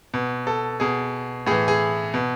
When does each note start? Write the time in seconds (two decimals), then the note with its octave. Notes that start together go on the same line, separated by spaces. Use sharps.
0.14 B2
0.47 A4
0.80 B2 G#4
1.47 A2 E3 G#4
1.68 G#4
2.14 B2